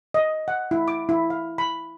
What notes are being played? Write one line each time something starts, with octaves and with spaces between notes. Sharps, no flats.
D#5
F#5
E4
D6
E4
F5
B5